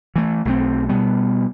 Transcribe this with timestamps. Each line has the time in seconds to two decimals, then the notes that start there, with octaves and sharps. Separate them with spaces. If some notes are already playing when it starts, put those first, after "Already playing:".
0.16 E3 A3
0.45 B1 A3 C4
0.89 B2 G3 B3